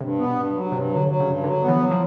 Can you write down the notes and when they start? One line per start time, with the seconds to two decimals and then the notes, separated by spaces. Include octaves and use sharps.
0.01 G2 C3
0.18 B3
0.24 B2
0.36 G2
0.55 F#3
0.72 G2 C3
0.89 F#3
0.96 D3
1.08 F#3
1.20 C#3
1.25 G2
1.44 D3 F#3
1.62 B3
1.68 E3
1.79 F#3
1.91 F3